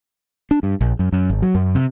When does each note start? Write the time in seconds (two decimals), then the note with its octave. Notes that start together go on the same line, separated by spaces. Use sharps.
0.51 D4
0.63 G2
0.81 A#1
0.99 F#2
1.12 F#2
1.30 G#1
1.42 F#3
1.55 F#2
1.75 C3